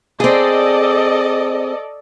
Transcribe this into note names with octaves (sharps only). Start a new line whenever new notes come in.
C4 G#4 A4 D5 D#5